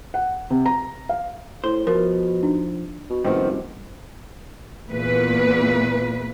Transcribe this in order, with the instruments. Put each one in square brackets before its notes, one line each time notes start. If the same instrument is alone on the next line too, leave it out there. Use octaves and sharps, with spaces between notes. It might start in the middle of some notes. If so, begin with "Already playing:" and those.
[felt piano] F#5
C3
A#5
F5
[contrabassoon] A2 [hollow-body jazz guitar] C5
[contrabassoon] B2 [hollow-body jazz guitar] F3 [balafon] A#4
[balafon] D4 D#4
[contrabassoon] B2
[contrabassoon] F#1 [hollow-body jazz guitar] G2 C3 [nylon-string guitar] D#3 F3 B3
[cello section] E2 A#2 B4